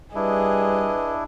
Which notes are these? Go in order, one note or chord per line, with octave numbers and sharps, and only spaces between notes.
G3 D4 E4 G#4 B4 D#5